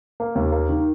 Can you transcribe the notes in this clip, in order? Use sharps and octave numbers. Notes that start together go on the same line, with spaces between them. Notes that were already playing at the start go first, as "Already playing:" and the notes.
A#3
D#2
A#3
D#3